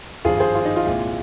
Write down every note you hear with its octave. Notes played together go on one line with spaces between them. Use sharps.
G#1 G2 F3 F4 G#4
G#4 C5
F4
D#4
F4
C2 A#2 G#3